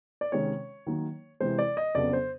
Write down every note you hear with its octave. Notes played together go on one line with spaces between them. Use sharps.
D5
C3 D#3 G#3 C#4 C#5
D#3 F#3 A#3 D#4
C3 E3 G#3 C5
D5
D#5
F2 C#3 F#3 B3 D4 D5
C5